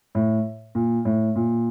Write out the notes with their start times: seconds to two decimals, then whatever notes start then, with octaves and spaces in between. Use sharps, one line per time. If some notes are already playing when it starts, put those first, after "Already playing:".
0.15 A2
0.75 A#2
1.05 A2
1.36 A#2